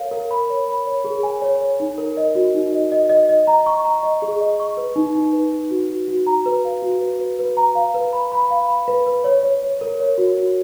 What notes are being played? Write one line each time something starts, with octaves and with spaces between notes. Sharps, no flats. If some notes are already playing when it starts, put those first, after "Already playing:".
Already playing: A#4 C#5 F5
A#4
B5
C#5
B5
C#5
G#4
G#5
C#5
C#5
D#4
A#4
D#5
F#4
D#4
D#5
D#5
D#5
D#5
A#5
C#6
A#5
D#5
G#4
D#5
C#6
B4
D#4
D#4
B4
D#4
F#4
F#4
F#4
A#5
B4
F5
F#4
B4
B4
B4
A#5
F5
B4
B5
B5
F5
B5
B4
B4
C#5
C#5
C#5
A#4
C#5
F#4
F#4